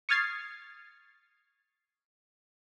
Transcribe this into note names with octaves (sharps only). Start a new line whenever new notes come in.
C#6 D#6 F6 G#6 A6 C7